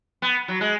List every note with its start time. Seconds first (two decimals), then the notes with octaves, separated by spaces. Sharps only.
0.22 B3
0.48 F#3
0.61 G#3